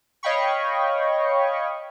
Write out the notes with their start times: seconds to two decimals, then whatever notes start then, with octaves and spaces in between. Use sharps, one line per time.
0.23 C#5 D#5 F5 G5 B5 C#6